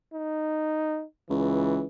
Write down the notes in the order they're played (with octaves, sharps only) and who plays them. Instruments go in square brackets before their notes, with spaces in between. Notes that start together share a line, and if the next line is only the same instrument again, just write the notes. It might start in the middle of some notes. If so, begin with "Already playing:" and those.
[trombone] D#4
[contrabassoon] C#2 [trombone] E3